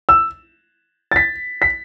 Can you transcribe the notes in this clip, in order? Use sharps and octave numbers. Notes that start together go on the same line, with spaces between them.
E6
A6
B6
B6